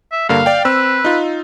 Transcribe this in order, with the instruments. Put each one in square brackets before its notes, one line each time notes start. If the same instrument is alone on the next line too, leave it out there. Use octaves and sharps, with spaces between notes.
[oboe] E5
[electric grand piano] G2 D3 A#3 [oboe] F5
[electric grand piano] D5 G5
[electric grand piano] C4 E6 [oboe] B4
[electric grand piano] D#4 F4